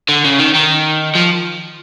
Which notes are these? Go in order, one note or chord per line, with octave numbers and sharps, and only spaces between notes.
D3
C#3
D#3
D#3
F3